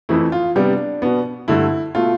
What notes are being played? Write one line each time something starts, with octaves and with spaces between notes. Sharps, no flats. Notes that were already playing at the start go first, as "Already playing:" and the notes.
F2 E3 A3 E4
F4
C3 G3 B3 D4
B2 B3
G2 D3 A3 E4
B2 A3 F4